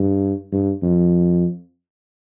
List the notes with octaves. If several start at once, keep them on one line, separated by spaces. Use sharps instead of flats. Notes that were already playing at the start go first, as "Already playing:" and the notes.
Already playing: G2
G2
F2